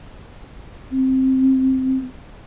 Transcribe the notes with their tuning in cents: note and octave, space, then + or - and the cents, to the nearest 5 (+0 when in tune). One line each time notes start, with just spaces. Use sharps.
C4 +5